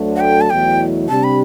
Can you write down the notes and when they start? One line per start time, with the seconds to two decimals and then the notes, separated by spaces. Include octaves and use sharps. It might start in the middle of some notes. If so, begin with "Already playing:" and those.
Already playing: D2 D3 F#3 A3
0.16 F#5
0.20 G5
0.41 A5
0.50 E2 B2 F#3 A3 E4 G5
1.09 C3 G3 D4 G4 A5
1.24 B5